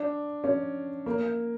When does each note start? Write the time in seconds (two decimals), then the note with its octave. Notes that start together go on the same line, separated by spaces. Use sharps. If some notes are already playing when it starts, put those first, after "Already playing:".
Already playing: D4
0.44 C#4
1.06 A#3